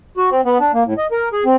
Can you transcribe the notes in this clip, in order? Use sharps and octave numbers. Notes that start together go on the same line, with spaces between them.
F#4
C4
B3
D4
A#3
A2
D#5
A#4
G#4
C4